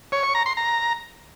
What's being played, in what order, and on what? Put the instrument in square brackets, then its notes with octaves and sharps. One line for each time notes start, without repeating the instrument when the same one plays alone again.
[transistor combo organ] C#5
C#6
A#5
C6
A#5